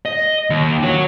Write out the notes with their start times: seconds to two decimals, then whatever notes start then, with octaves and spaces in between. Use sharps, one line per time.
0.05 D#5
0.50 D#2
0.83 F#4 C#5